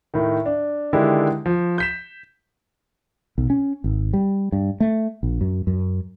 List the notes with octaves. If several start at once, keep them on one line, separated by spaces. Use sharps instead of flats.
A2 D#3
D4
D3 D#3 G#3 D4 E4 G4
F3
G6 B6 E7
B1
C#4
G#1
G3
G2
A3
A#1
F#2
F#2